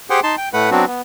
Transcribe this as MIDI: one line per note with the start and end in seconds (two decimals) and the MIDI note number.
0.10 0.20 67
0.10 0.20 68
0.10 0.20 72
0.10 0.20 78
0.10 0.20 79
0.23 0.36 63
0.23 0.36 81
0.23 0.36 84
0.38 0.49 79
0.53 0.70 45
0.53 0.70 57
0.53 0.70 71
0.53 0.70 78
0.71 0.85 54
0.71 0.85 59
0.71 0.85 60
0.71 0.85 62
0.71 0.85 66
0.87 1.02 59